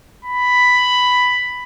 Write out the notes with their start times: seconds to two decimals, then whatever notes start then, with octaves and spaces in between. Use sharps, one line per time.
0.25 B5